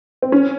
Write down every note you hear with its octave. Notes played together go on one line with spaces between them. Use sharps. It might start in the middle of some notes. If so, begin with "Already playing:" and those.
C4
C#4